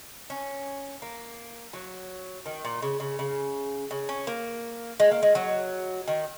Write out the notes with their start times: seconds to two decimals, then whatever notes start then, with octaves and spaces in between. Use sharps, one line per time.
0.30 C#4
1.02 A#3
1.73 F#3
2.46 D#3
2.65 A#2
2.82 C#3
3.00 C#3
3.19 C#3
3.91 C#3
4.09 C#4
4.27 A#3
5.00 G#3
5.11 A#3
5.23 G#3
5.35 F#3
6.08 D#3